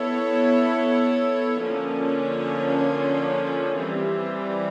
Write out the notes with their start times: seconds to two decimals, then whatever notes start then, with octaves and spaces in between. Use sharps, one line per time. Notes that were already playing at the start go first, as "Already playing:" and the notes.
Already playing: B3 E4 A4 C#5
1.60 D3 F3 A#3 C#4
3.76 E3 G3 C4